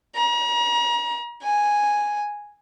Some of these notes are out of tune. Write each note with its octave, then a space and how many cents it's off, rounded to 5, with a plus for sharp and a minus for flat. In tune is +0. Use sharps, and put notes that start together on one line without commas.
A#5 +40
G#5 -5